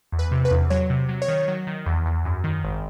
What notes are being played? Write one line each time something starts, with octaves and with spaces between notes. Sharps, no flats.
E2
B4
C3
B4
E2
F#3 C#5
C3
F#3
C#5
D#3
F#3
D#3
E2
E2
F#2
D#3
G#1